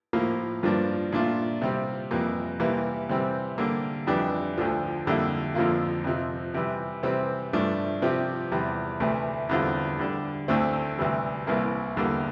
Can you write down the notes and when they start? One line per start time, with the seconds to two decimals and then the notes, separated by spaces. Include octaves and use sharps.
0.13 A2 F3 A#3
0.63 G2 F3 A#3 D4
1.12 A#2 A3 D4 F4
1.62 C3 G3 C4
2.11 F2 E3 G3 A#3
2.60 C3 E3 G3 A#3
3.09 C3 E3 G3 C4
3.58 D3 G3 A#3
4.07 F2 E3 G3 D4 G4
4.58 D2 D3 F3
5.07 F2 D3 G3 A#3 E4
5.55 F2 D3 F3 A#3 F4
6.04 F2 C3 F3
6.54 C3 E3 G3
7.03 C3 E3 G3 C4
7.53 G2 F3 A3 D4
8.02 C3 F3 C4 G4
8.52 E2 C3 G3
9.00 D2 C3 E3 A3
9.49 E2 D3 G3 C4 F4
9.99 D3 G3 D4
10.48 D2 D3 A3 C4 E4
10.97 D2 C3 E3 G3
11.47 C2 C3 E3 A#3 E4
11.97 E2 D3 G3 A#3